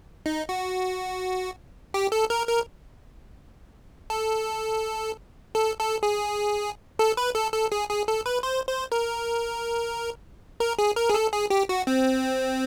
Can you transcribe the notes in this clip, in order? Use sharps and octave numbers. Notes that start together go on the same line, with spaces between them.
D#4
F#4
G4
A4
A#4
A#4
A4
A4
A4
G#4
A4
B4
A4
A4
G#4
G#4
A4
B4
C5
C5
A#4
A#4
G#4
A#4
G#4
A4
G#4
G4
F#4
C4